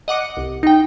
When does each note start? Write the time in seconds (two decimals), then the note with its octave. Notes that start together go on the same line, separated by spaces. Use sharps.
0.08 D#5 F#5 D6 C#7
0.37 C2
0.63 D#4 G5